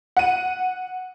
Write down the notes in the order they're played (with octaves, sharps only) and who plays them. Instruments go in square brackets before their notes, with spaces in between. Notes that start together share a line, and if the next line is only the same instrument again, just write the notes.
[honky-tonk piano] F#5 D#7